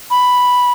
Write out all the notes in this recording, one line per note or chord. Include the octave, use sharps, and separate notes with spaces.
B5